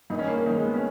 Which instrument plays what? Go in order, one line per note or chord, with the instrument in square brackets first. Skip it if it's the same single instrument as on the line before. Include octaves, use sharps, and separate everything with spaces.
[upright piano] G2 D#3 D#4
C#4
A#3
A#3
G2 D#3 D#4
G#3
B3
C#4